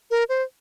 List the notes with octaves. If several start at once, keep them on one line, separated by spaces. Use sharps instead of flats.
A#4
C5